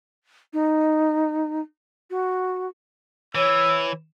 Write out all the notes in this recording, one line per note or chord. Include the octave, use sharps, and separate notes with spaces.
D#4
F#4
E3 C#5 E6